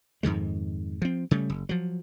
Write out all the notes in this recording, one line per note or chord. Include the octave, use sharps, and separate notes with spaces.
F2 G#2 D#3 G#3
F3 C4
C#3 G3 A3
F#1
F3 F#3